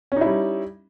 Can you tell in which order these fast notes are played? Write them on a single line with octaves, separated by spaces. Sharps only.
C#4 D#4 E4 G3